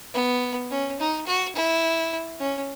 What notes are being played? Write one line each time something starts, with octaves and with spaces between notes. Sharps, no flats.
B3
C#4
D#4
F#4
E4
C#4